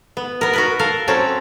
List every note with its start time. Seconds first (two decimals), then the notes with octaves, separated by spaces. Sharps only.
0.17 B3
0.41 B3 A#4
0.53 F#4 A#4 B4
0.79 A4 A#4 F5
1.08 F#3 C4 C#4 F#4 A4